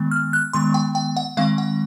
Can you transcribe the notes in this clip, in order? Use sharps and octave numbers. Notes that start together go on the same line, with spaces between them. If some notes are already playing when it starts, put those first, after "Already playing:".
Already playing: D#3 G#3 B3
F6
F#6
D#3 G#3 B3 C6
G5
G5
F#5
D#3 G#3 C4 F5
F#5